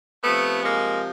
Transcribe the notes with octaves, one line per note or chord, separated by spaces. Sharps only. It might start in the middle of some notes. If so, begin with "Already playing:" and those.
C3 F3 A3 B3
G#3 A#3